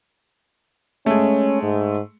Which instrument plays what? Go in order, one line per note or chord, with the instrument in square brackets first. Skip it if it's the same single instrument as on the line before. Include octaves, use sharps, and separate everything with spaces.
[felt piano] G#3 A3 [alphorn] C#4
[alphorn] G#2